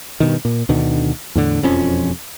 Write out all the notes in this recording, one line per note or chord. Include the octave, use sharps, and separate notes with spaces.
G2 B2 D#3
A#2
D2 B2 D3 D#3
E2 A2 D3
E1 F2 F3 C#4